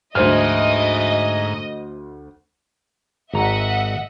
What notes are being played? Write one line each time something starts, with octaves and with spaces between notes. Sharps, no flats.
D2 G#2 C5 D#5 E5 G#5 F6
G#1 D#5 E5 F#5 A#5